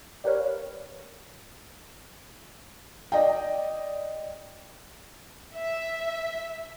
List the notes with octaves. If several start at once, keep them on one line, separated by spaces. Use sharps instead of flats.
D4 G4 A#4 B4 C#5 F5
D5 D#5 G5
E5